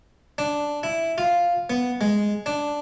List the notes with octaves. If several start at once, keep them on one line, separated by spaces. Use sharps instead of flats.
D4
E4
F4
B3
G#3
D4